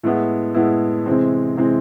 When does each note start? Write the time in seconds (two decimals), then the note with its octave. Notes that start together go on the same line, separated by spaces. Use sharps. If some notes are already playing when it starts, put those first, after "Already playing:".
0.03 A2 G#3 B3 E4
0.54 A2 G#3 B3 E4
1.06 C3 E3 G#3 C4
1.57 C3 E3 G#3 C4